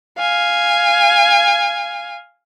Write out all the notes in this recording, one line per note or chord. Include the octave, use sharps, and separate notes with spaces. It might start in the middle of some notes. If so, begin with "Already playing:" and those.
F5 G#5